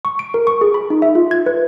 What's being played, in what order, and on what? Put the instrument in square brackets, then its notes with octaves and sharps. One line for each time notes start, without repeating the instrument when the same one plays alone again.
[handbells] C#6
D7
A#4
C#6
G#4
B5
D#4
E5
F4
G#6
B4